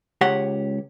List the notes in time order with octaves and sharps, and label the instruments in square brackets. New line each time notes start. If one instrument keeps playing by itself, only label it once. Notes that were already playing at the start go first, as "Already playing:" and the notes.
[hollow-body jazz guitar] C#2 G4 C#5 F#5